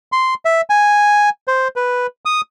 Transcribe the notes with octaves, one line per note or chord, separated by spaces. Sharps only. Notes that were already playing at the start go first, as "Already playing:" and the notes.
C6
E5
G#5
C5
B4
D#6